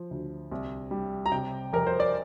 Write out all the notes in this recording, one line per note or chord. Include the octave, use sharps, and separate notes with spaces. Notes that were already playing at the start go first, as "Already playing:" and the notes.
Already playing: F3
D2
C2
G3
A#5
C3 G5
F1 A#4
C5
D5